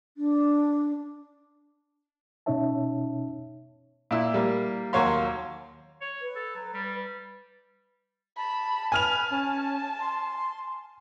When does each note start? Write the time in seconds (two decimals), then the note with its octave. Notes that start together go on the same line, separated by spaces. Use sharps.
0.17 D4
2.46 B2 C#4 D#4 C#5 E5 A5
4.11 A#2 E4 E6
4.34 G3 A#3
4.93 D#2 F#3 A#3 C#5 F5 C6
6.01 C#5
6.22 B4
6.36 A4
6.56 F#3
6.74 G3
8.37 A5 B5
8.92 B4 G#5 F6 F7
9.30 C#4 A5
10.00 C6